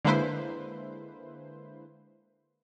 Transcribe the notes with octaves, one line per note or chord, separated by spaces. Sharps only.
D3 G#3 A#3 E4 B4 C5